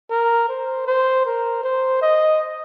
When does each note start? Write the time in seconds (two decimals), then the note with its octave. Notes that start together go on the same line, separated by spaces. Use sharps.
0.10 A#4
0.49 C5
0.87 C5
1.26 A#4
1.63 C5
2.01 D#5